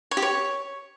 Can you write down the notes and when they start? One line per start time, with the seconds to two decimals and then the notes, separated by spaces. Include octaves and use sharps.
0.11 C#5
0.17 G4
0.22 C#5